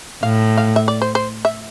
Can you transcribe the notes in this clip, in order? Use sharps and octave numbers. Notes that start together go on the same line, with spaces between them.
A2 F5
F5
E5
D5
C5
C5
E5